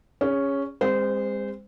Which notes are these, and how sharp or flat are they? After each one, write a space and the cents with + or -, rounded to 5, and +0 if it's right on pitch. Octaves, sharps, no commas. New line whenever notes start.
C#4 +0 G#4 -25
G#3 -35 C4 +20 C5 -25